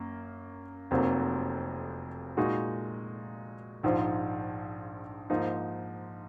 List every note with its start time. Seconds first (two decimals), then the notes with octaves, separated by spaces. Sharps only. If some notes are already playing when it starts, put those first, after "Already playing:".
Already playing: F#2 A#3
0.91 F1 F2 C3 F#3 A#3
2.37 A#2 G#3 D#4 F#4
3.83 A#1 G#2 F3
5.30 G#2 F3 A#3 D#4